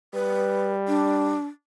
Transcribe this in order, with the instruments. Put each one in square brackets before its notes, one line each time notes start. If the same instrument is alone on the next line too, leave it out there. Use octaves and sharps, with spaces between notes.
[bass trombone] G3 [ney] B4
[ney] D4